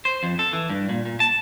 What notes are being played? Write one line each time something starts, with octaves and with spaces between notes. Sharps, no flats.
C5
F2
A4
E3
G2
A#2
A#2
A5